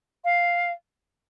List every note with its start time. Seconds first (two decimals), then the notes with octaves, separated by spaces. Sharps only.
0.24 F5